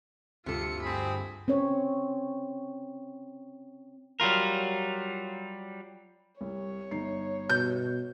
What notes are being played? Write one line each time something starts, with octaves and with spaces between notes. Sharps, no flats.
D2 G2 C3 F4 A4 C#7
C4 G#4 B5
C4 C#4 C#5
F#3 G3 F4 A#4
C2 C#5
G1 D#4 C7
B2 G6